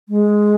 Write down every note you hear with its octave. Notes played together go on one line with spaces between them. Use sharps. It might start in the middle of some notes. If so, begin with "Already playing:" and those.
G#3